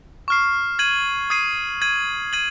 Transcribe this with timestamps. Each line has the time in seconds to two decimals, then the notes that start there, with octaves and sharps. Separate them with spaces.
0.28 C#6 F6 C7
0.79 G#6 D#7 F#7
1.30 D#6 G#6 C7 D#7
1.82 G#6 D#7 F#7
2.33 G#6 D#7 F#7